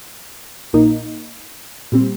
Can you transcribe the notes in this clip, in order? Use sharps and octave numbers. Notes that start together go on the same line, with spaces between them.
A#1 A#2 A#3 D#4
A#2 G3 C4